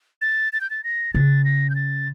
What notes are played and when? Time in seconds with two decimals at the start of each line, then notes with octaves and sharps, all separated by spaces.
0.22 A6
0.53 A6
0.61 G6
0.70 A6
0.84 A#6
1.14 C#3 A6
1.45 A#6
1.70 G6
1.76 A6